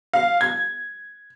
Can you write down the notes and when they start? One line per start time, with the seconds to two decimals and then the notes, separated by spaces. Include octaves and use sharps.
0.13 F5
0.41 G#6